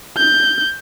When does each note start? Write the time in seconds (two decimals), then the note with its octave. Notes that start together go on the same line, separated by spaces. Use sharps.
0.17 G6